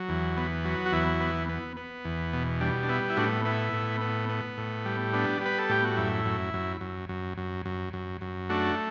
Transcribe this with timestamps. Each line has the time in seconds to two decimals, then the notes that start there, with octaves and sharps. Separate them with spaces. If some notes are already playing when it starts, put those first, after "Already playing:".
Already playing: F#3
0.09 E2
0.37 B3
0.65 F#3
0.86 F#4
0.92 E2 E4
1.20 B3
1.49 B3
1.77 B3
2.05 E2
2.33 B2
2.60 G3 D4
2.83 D4
2.89 B3 E4
3.10 E4
3.17 A2 D4 F#4
3.45 B3 E4
3.73 A2
4.01 B3
4.29 B3
4.58 A2
4.85 G3
5.13 B3 D4
5.41 G3 B4
5.58 A4
5.69 A2 G4
5.84 F#4
5.97 F#2 E4
6.25 F#2
6.54 F#2
6.81 F#2
7.09 F#2
7.38 F#2
7.66 F#2
7.93 F#2
8.21 F#2
8.50 A3 D4 F#4